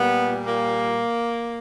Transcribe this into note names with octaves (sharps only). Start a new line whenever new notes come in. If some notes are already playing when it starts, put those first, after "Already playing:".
Already playing: A#2 G3 B3
A#3